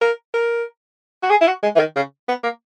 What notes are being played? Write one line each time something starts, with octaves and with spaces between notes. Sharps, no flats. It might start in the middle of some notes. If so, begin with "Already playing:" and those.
A#4
A#4
F#4
G#4
E4
F#4
G#3
E3
D#3
C#3
B3
A#3